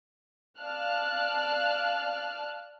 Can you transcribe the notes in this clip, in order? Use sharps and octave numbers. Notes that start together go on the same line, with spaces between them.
D5 F5 A5 F6 F#6